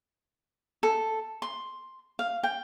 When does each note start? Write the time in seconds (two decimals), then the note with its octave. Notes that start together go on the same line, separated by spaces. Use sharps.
0.83 A4
1.42 C6
2.19 F5
2.43 G5